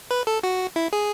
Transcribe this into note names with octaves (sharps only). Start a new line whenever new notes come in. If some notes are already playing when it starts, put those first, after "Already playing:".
B4
A4
F#4
E4
G#4